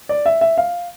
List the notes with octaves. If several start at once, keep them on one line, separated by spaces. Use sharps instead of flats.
D5
E5
E5
F5